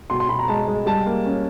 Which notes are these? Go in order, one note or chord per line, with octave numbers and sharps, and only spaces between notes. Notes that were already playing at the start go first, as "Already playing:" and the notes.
B2 C6
C6
B2 B5
A#5
G#3 A5
G#3
G3 A5
A#3
C#4